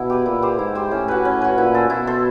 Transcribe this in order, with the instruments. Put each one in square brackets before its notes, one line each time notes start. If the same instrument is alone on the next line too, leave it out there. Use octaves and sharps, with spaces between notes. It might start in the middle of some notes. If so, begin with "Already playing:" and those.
Already playing: [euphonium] B2 [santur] B3 E4
[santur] G4 B4
[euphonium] A#2 [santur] E4
[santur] G4 C5
[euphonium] G#2 [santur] E4
[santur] G4 C5
[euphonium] A2 [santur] C#4
[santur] F#4 B4
C#4
F#4 B4
[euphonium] A#2 [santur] E4
[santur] A4 C5
[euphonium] B2 [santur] E4
[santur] A4 C5